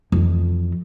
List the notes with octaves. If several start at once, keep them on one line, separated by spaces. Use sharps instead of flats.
F2 E3